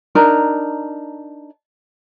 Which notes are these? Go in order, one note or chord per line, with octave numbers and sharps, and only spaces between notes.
D4 D#4 A#4